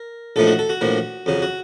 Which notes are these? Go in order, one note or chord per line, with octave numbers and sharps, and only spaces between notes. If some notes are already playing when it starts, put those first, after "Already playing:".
Already playing: A#4
A#1 A2 F3 A3 D#4 A4
F#4
A4
F#4
A#1 A2 F3 A#3
F2 C#3 F#3
F#4